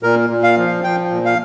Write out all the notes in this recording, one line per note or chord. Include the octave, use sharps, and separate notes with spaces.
A#2 A#4
A#2
F5
F3
F3 G5
A#2
F5